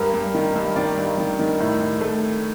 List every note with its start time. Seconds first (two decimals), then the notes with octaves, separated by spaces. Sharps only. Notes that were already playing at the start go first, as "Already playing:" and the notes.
Already playing: G2 A#4
0.14 G2
0.34 D#3
0.56 G2
0.76 D#3 D5
0.97 G2
1.18 D#3
1.39 D#3
1.60 A2
1.81 A2
2.01 A3